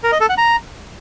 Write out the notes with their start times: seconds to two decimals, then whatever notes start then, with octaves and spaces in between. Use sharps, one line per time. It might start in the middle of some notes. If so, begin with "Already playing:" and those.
0.04 A#4
0.12 D#5
0.21 A4
0.29 F#5
0.38 A#5